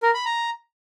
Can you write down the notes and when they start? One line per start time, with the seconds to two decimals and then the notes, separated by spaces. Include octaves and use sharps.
0.03 A#4
0.14 B5
0.25 A#5